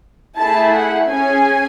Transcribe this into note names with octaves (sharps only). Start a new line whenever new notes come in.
A3 E4 G#4 A5
F#5
C#4 G#4 G#5